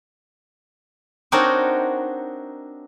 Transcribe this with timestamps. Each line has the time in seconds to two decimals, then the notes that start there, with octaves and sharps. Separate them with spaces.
1.32 C4 D4 D#4 F#4 A#4 C#5